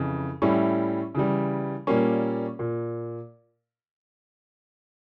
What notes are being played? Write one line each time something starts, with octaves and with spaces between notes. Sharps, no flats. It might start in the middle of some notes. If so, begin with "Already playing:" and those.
Already playing: F2 C#3 E3
A2 G3 C#4 E4
C#3 E3 G3
A#2 G3 A#3 C#4
A#2